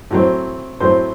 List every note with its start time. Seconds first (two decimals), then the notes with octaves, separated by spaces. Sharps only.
0.11 A2 F#3 C4
0.80 A2 F#3 C4 C5